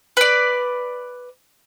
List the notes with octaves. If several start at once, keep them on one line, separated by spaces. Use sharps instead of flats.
B4 D5